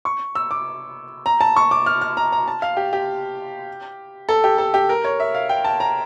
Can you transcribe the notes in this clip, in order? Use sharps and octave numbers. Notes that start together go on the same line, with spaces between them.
C#6
E6
D6
A#5
A5
C#6
D6
F6
F6
A#5
A#5
A5
F5
G4
G4
A4
G4
A4
G4
A#4
C#5
E5
F5
G5
A5
A#5